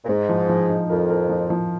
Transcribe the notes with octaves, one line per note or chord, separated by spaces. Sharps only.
A#2
G#2 G#3
F3
F3
D#4
F2 A#4
A#4
F3
F3